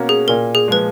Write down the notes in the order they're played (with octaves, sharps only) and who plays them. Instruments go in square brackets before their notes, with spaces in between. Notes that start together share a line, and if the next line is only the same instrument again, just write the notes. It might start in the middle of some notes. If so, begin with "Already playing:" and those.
Already playing: [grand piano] B2 A#3 C#4 F#4
[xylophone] G#4
[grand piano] A#2 [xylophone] A#4
[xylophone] G#4
[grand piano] F3 G#3 [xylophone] B4